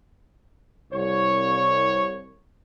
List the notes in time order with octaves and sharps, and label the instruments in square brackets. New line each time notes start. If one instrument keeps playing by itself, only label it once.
[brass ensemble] C2 C#5